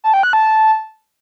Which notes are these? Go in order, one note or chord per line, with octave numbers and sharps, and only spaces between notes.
A5
G5
F#6
A5